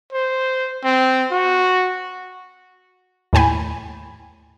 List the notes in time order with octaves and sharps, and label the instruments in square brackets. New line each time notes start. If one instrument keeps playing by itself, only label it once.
[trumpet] C5
C4
F#4
[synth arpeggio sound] D#2 A2 G5 G#5 B5